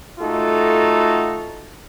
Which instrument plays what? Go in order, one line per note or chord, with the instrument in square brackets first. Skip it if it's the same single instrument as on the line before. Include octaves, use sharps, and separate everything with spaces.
[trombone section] A3 D#4 F4 F#4 A4